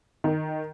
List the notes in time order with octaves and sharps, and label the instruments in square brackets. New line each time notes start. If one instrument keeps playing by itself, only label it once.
[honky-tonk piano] D#3